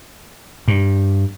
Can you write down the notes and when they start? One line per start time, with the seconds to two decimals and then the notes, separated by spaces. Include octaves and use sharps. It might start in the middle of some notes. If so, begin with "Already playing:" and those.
0.68 G2